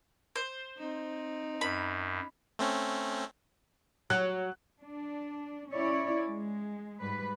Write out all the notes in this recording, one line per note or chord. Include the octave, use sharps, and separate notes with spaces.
C5
C4 D#4
F#2 B5
A3 C4 C#4
F#3 F#6
D4
C#4 E4 C#5 D5
G#3
G#2 G3 B4